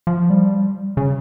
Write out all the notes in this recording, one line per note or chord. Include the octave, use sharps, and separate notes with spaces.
F3
G3
C#3